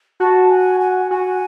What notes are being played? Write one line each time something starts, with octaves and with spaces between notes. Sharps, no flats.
F#4 A5
G#5
G#5
F#4 G#5